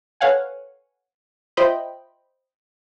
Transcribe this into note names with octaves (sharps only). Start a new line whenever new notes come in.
A4 B4 C#5 F5 F#5 G#5
F4 C5 D#5 E5 G5 B5